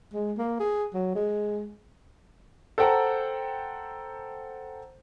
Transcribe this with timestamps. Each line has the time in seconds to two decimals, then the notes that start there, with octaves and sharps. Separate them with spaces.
0.13 G#3
0.38 A#3
0.60 G#4
0.94 F#3
1.15 G#3
2.78 A4 C5 F#5 G5 A5 A#5